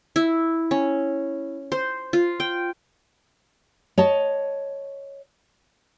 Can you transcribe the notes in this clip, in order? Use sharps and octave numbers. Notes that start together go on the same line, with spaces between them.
E4
C#4
C5
F4
G5
C#5 D#5 A5